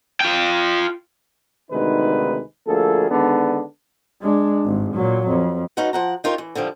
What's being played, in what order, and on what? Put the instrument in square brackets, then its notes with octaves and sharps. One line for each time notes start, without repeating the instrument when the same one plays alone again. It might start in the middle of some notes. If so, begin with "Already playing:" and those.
[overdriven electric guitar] F4 G5
[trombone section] D2 C3 D#3 G#3 D#4 B4
D2 F3 A#3 G#4 A4
D3 D#3 G#3 B3 D4
[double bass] G#3 D4
G#1 G2
A#2 F#3
F2
[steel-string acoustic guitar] G#3 C#4 D#4 F4 F#4 B4
F3 F#5 A#5
D#4 F4 G4 A#4 C#5
E3
D3 D#3 F3 G3